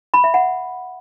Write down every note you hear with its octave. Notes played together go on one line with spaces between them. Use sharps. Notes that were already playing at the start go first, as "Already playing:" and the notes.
B5
E5
F#5